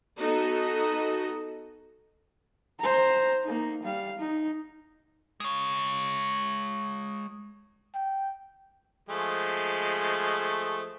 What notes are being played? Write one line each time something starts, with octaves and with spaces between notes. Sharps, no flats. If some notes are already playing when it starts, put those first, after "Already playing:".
B3 D#4 F#4 A4 D#5
C5 A#5
A#3 D#4
G3 F5
D#4
G#3 C#5
G5
F3 G#3 A3